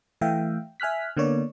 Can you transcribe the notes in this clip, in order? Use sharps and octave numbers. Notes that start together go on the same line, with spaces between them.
E3 A3 E5 F5 G5
E5 G#5 F6 F#6 B6
D3 A#3 B3 C#5 D5